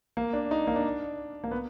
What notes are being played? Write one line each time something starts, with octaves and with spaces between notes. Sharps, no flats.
A#3
D4
D#4
A#3
D4
A#3
B3